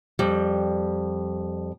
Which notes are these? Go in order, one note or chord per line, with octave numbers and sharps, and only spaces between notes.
F2 G3